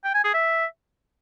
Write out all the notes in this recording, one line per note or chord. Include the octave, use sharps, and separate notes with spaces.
G5
G#5
G#4
E5